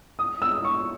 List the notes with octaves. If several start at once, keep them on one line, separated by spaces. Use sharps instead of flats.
D#6
E6
C#6